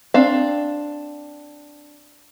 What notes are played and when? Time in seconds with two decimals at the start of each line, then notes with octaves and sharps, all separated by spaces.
0.14 C4 D4 F5